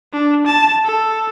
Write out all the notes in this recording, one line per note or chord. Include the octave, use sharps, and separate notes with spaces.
D4
A5
A4